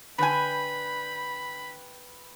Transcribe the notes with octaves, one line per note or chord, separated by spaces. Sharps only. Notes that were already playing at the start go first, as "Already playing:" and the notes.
D3 B4 G5 G#5 B5